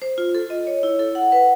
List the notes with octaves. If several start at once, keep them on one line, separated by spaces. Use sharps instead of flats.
C5
F4
A4
D#5
C#5
E4
A4
F#5
B4